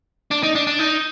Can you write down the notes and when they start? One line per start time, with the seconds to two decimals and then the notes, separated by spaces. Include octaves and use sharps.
0.31 D4
0.43 D#4
0.55 D4
0.67 D4
0.79 D#4